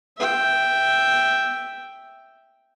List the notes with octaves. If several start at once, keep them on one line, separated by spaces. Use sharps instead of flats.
E5 G5